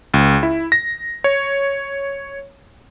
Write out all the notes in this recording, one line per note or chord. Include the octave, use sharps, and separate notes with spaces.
C#2
E4
A#6
C#5